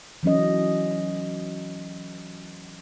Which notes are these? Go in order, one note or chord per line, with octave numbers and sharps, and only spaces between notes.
E3 F#3 C#4 D#5